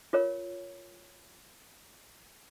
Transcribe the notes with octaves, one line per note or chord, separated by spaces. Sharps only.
F4 A#4 C#5